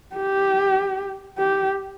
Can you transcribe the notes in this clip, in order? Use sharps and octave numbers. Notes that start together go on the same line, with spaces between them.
G4
G4